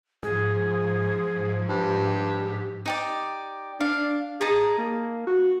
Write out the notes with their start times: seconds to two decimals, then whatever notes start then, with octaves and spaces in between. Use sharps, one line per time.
0.23 G#2 F3 G#4
1.69 G2 G4
2.86 D#4 G4 D5
3.80 D4 F5
4.41 D#4 G#4 A5 A#5
4.78 A#3
5.27 F#4